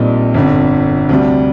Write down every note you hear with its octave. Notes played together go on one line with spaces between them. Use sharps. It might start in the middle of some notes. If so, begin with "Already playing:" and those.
Already playing: A#1 A#2 G3 C4 D#4
G1 F2 D3
D2 C3 G3